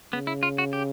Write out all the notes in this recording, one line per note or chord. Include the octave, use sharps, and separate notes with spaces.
C#3 B3
E4
F4
F#4
G4